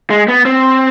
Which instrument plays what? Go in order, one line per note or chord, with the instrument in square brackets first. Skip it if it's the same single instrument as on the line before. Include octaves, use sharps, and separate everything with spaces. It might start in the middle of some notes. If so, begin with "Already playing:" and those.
[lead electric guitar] G#3
B3
C4